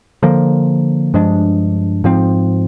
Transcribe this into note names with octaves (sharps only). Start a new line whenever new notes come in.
D3 F3 A#3
G2 F3 G#3 D4
G#2 F3 C4